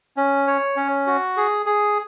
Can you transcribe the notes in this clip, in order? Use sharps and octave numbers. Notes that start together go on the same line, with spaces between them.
C#4
C#5
C#4
F#4
G#4
G#4